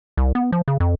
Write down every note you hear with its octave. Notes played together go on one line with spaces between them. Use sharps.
C2
B3
F3
C#3
F2